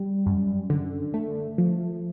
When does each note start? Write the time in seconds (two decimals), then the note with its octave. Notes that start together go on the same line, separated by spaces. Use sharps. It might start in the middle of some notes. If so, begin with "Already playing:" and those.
Already playing: G3
0.26 F#2
0.70 D3
1.14 A3
1.58 F3